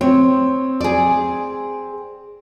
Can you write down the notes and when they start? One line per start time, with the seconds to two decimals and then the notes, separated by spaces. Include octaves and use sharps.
0.01 C4 C#5
0.81 G#4 D5